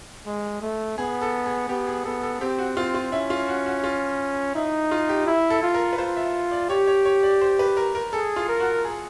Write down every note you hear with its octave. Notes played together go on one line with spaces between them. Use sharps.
G#3
A3
B3 G#4
A4
G#4
B3 G4
G#4
B3 A4
A4
C4 G4
F#4
C4 F4
F4
C#4 E4
F4
F#4
F#4
F4
D#4 E4
F4
G4
E4
A4
F4
A#4
B4
F4 C5
E5
D5
G4 C#5
C#5
C#5
D5
C5
B4
A#4
A#4
G#4 A4
F4
A#4
F#4
G#4